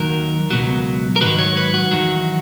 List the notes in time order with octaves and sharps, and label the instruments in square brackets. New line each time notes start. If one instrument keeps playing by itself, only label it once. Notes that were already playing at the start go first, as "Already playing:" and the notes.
Already playing: [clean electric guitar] D#2 D#3 F#3 A#4
C#2 B2 F#3
A#4
G#2 D#3 F#3 B4
C#5
B4
F#4
E2 D#3 F#3